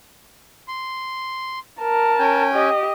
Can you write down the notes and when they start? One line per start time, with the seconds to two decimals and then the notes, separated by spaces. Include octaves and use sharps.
0.68 C6
1.81 A#4 A5
2.19 C#4 G5 G#5
2.54 G4 D#5